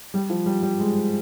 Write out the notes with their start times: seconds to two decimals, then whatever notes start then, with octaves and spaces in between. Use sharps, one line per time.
0.14 G3
0.30 F3
0.46 G3
0.62 G3
0.80 G#3